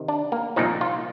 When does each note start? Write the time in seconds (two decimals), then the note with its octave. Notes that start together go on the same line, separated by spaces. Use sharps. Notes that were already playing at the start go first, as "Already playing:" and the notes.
Already playing: C3 D#3
0.08 D4
0.32 A#3
0.56 C2 A#2 F3 D#4
0.81 F4